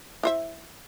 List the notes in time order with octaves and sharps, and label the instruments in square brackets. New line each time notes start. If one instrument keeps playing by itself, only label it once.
[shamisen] E4 C5 E5